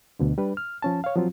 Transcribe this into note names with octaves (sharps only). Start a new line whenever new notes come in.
D2 B2 D3
G3 D4 B4
F6
F3 C#4 A5
C#5 F5
F3 F#3 C4 F4